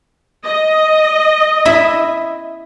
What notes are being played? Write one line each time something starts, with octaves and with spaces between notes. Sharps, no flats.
D#5
E4 E5